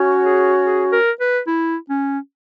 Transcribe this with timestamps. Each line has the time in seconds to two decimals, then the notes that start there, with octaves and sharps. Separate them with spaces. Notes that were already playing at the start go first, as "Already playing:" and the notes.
Already playing: C#4 F#4 C#5
0.23 G#4
0.64 G#4
0.92 A#4
1.20 B4
1.47 E4
1.89 C#4